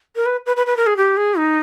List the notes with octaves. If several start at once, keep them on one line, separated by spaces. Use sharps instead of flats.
A#4
B4
B4
B4
B4
A#4
G#4
G4
G#4
D#4